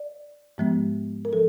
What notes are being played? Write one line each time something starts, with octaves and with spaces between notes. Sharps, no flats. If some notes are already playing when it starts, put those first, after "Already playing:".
Already playing: D5
G#2 F3 G#3 B3
A#4
F3 A4